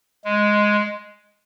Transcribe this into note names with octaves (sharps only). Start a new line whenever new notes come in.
G#3